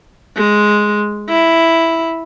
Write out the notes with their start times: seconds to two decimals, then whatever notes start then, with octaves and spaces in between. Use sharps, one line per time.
0.36 G#3
1.29 E4